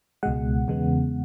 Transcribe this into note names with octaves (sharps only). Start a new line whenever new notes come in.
C#2 B2 G#3 F#5
E2 C#3 G#3 B3